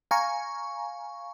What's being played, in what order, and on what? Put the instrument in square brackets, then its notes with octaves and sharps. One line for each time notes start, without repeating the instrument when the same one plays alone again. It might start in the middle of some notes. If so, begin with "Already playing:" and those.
[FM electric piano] F5 G#5 A#5 C#6